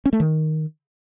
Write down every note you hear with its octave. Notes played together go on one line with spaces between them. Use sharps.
C#4
A3
D#3